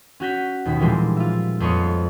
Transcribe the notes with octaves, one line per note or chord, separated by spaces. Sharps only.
C#4 F#4 G6 B6
D#2 B2 D#3 B6
A#2 E3 F3 G3 G#3 C4
F4 E5
F2 B3 C5 C#5 D#5 C#7